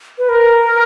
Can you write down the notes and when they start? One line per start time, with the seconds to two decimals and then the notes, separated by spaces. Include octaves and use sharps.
0.18 B4
0.29 A#4